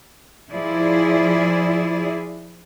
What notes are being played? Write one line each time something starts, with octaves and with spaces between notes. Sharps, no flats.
F3 E4 G#4 D5